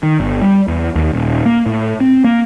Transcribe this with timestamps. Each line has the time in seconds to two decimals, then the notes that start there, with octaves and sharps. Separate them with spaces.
0.03 D#3
0.20 G1
0.42 G3
0.68 E2
0.95 D#2
1.13 D#1
1.46 A#3
1.66 A2
2.00 C4
2.24 A#3